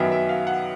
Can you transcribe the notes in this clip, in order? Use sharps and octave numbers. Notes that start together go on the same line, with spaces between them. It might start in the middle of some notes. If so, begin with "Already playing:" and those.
Already playing: F#2 D#3 F#3 B3 E5
E5
F5
F#5